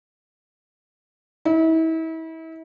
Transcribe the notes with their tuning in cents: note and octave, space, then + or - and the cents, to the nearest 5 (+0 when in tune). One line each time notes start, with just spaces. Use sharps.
E4 -35